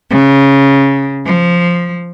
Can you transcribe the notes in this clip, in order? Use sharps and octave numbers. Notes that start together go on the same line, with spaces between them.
C#3
F3